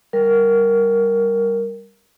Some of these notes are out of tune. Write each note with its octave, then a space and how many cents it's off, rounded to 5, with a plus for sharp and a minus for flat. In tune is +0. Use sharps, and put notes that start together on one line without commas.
G3 +0 A#4 +0